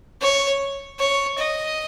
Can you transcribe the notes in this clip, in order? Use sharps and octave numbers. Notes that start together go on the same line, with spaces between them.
C#5
C#5
D#5